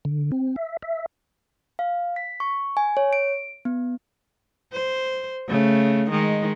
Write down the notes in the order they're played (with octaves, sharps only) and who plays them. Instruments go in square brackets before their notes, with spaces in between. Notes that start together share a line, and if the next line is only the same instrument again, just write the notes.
[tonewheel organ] D3
C4
E5
E5
[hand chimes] F5
B6
C#6
G#5
C#5
D7
B3
[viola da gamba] C5
C#3 A3
D#3 G#3